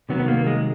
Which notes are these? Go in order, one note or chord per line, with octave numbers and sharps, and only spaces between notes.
C3 D#3 F#3 B3
B3
A#3
G#3